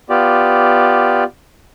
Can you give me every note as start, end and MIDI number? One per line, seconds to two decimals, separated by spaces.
0.10 1.24 59
0.10 1.24 65
0.10 1.24 67
0.10 1.24 74